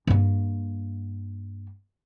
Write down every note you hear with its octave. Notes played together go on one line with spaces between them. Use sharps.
G2 A#3